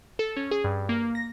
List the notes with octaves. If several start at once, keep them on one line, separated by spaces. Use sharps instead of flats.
A4
C#4
G#4
G2
A#3
A#6